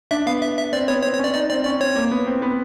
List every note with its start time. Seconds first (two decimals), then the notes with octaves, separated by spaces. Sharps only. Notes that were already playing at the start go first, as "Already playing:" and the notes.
0.11 D4 E5
0.26 B3 F5
0.42 E5
0.58 E5
0.73 C4 D5
0.88 B3 C#5
1.03 C4 C#5
1.14 C#5
1.19 C#4 D5
1.34 D#4 D5
1.49 C4 D5
1.65 C#4 D5
1.80 C4 C#5
1.96 A#3
2.11 B3
2.27 C4
2.42 B3